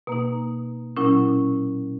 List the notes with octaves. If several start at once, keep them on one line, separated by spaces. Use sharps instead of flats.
B2 A#3 D#4
A#2 F#3 C#4 E4